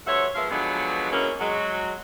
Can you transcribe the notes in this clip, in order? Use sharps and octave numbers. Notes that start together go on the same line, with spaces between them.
D2 G2 C5 C#5 E5 F#5
F3 G#3 A#3 B3 E5 F5
B2 D3 F3 F#3 G#3 B3
E3 F#3 G#3 A#3 C#4
F#3 G#3